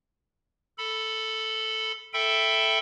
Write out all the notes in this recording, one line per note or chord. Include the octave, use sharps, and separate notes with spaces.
A4 B5
A4 E5 G5 B5